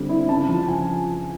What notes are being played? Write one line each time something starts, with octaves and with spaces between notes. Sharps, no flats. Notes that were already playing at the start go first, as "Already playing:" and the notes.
Already playing: D3 G3 C4
E4
C#3 A5
F3
G#5